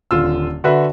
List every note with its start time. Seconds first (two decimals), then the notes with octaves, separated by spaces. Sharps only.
0.11 D#1 D3 F4 E6
0.64 D3 F#4 B4 E5